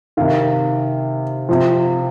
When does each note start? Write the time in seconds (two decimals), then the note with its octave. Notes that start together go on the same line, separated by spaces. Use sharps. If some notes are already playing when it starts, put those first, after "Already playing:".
0.17 C3 D#3 F5
1.49 C3 F3